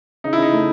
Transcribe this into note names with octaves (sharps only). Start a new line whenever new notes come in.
C#3 D#4
E4
C#3 D#4
A3